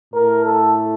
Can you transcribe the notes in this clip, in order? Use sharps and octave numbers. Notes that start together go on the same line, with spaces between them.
A2 A3 A#4
A4